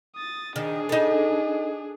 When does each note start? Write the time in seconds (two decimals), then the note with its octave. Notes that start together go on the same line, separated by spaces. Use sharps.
0.15 D#6 A6
0.56 D#3 D4 G#4
0.89 D#4 A4